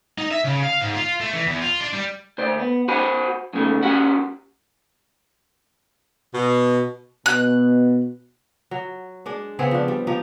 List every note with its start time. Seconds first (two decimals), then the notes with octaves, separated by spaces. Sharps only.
0.18 D#4
0.31 E5
0.45 C#3
0.63 F5
0.81 G#2
0.95 F4
1.21 A3
1.33 E3
1.47 E2
1.62 F4
1.80 D4
1.93 G3
2.38 D2 C5 D5
2.59 B3
2.88 F#4 C5 F#5 G#5 B5
3.53 F#2 C#3 A3
3.83 C#4 F#4 G4 F#5
6.33 B2
7.26 B2 F#6
8.71 F#3
9.26 G#3 D4 D5
9.59 C#3 B3 C4 G#4
9.71 F3 D4
9.88 G3
10.07 F3 D#4 G4